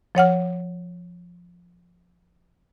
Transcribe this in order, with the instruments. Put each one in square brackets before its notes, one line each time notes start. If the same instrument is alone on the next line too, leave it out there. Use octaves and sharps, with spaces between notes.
[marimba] F3 C#5 F#5 F6